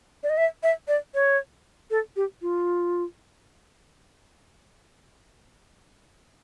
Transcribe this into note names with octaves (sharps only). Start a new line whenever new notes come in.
D5
D#5
E5
E5
D5
C#5
A4
G4
F4